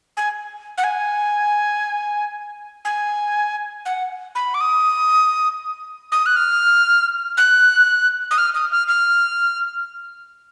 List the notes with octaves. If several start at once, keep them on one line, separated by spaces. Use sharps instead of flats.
G#5
F#5
G#5
G#5
F#5
B5
D6
D#6
D#6
F#6
F6
F#6
D#6
F6
D#6
F6
F6